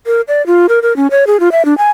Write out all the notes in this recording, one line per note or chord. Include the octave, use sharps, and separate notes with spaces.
A#4
D5
F4
A#4
A#4
C#4
C#5
G#4
F4
E5
D4
G#5